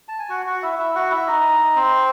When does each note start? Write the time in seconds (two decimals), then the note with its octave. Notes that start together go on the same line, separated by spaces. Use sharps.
0.08 A5
0.19 G#5
0.29 F#4 F#5
0.46 F#4 F#5
0.63 E4 E5
0.78 E4 E5
0.95 F#4 F#5
1.11 E4 E5
1.27 D#4 D#5
1.76 C4 C5